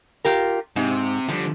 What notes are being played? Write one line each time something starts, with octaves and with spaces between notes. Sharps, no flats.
F4 G4 A#4
G#2 C3
D3 F3 G3